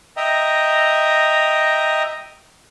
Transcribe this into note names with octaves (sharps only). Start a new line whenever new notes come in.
D#5 E5 G5 A#5